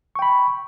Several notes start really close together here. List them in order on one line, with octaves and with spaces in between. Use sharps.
C#6 G5 B5